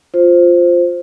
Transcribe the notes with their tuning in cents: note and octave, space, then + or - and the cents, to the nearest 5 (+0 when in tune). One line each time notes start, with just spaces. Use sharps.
F4 +5 C5 +0